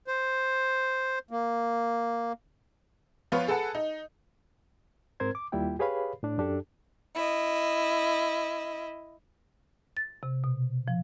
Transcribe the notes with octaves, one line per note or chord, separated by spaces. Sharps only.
C5
A#3
F3 B3 F4 B4 C#5
G#4 A4 B4 F#5 A5
D#4
G#2 C4 A#4 C5 G#6
D6
D#2 G3 A#3 E4 F4 G5
G4 G#4 B4 C#5 F5 B5
A2 D4
F#2 D4 G4 A4
E4 D#5
A6
C3
B2
F3